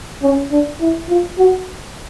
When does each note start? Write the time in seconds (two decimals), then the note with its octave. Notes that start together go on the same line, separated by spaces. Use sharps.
0.22 C#4
0.51 D4
0.81 E4
1.09 F4
1.39 F#4